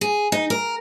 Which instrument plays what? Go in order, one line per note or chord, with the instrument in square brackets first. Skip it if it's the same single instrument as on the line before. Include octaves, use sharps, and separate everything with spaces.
[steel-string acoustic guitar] G#4
D#4
A#4